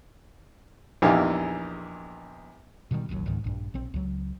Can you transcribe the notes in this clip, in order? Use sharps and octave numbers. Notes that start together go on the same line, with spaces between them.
A#1 E2 E3 D#4 G4 F5
B2 D#3 F#3 G3
D1 A1 D#2 F#3
C#2 G#2 D#3
A#1 G2
A#1 C4
C#2 F#3